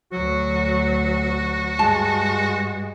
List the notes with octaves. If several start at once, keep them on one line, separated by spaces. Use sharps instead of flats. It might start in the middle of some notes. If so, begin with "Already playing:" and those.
D2 F#3 F#4
G2 G#3 A5